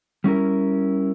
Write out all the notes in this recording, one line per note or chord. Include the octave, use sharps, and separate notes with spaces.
G3 C#4 E4 A#4